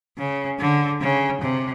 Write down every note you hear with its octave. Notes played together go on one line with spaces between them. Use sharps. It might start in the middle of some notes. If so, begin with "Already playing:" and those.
C#3
D3
C#3
C3